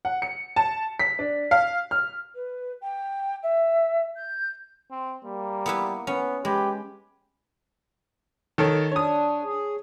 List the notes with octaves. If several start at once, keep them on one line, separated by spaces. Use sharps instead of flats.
F#5
C#7
A5
B6
D4
F5
F6
B4
G5
E5
G6
C4
G3 A#3
B3 E4 B4
B3 C#4
G#3 G4 B4
D#3 A4 C#5
D4 C#5 D#6
G#4